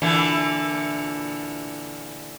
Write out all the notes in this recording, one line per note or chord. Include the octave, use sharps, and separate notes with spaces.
A#2 D3 E3